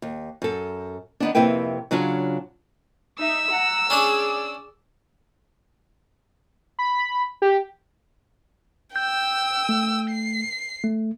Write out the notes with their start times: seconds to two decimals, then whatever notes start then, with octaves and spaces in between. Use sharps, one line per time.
0.02 D#2
0.42 F#2 A4
1.20 D#3 B3 D4
1.35 F2 C3 A#3 E4 B4 G5
1.91 C#3 F#3 D4 F4 C#5
3.19 D#4 E5 E6
3.51 F#5 A#5
3.90 C#4 D4 G#4 C#5 D5
6.79 B5
7.42 G4
8.96 G5 E6 G6
9.69 A3
10.11 C7
10.84 A3